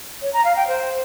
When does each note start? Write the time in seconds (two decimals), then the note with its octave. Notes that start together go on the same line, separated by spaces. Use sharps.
0.22 C#5
0.33 A#5
0.45 F5
0.56 G5
0.68 C5